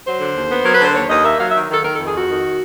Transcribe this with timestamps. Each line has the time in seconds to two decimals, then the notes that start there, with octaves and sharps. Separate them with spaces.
0.06 F#3 C5
0.20 D3
0.35 D#2
0.50 B3
0.63 F#3 A#4
0.73 B4
0.80 D3 C5
0.95 D#2 C#5
1.10 D#2 D#5
1.24 A#3 E5
1.39 F#3 F5
1.51 D#3 E5
1.69 D#3 A4
1.84 D#3 A#4
1.95 F2 A4
2.06 G#4
2.14 F2 F#4
2.28 D#3